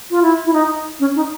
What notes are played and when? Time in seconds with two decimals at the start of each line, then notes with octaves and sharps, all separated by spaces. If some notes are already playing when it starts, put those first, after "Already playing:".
0.11 F4
0.22 E4
0.46 E4
0.53 D#4
1.00 C#4
1.16 D#4